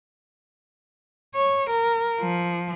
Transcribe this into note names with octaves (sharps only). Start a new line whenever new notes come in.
C#5
A#4
F3